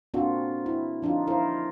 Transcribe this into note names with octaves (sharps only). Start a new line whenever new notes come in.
A#3 C4 D4 F4 F#4
E4
F3 D4 D#4 F4
E4 F4 A#4 C5